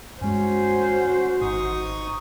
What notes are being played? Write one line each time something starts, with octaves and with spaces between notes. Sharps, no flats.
G2 G#3 C#4 F#4 C5
G#1 D#4 C#6 D#6